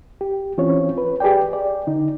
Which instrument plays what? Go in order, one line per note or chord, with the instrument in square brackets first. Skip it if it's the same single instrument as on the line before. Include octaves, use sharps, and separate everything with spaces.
[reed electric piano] G4
E3 C4 C#4 F4 C#5
B4
G4 G#4 B4 D5 G5
D5
D3 D#4